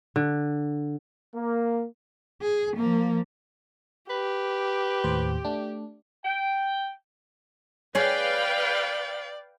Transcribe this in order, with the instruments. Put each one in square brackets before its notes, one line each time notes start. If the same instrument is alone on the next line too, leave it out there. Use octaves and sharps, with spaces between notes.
[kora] D3
[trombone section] A#3
[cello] G#4
F3 A#3
[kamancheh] G4 [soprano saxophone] B4
[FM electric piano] D#2 A2 C5
A3 D4
[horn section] G5
[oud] G#4 C#5 [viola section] B4 F5 G5 [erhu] D5